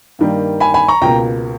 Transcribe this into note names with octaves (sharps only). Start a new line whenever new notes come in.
G2 D#3 G3 A#3
G#5 B5
G#5 B5
A#5 C#6
C#2 B2 A#3 G5 A#5